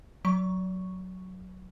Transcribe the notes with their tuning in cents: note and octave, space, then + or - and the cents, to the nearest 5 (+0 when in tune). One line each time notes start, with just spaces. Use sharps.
F#3 +0 C#6 +0